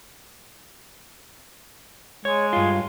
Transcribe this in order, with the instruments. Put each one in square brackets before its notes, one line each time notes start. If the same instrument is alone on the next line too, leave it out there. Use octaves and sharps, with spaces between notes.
[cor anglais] G#3 [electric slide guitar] C#5
[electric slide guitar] G2 F4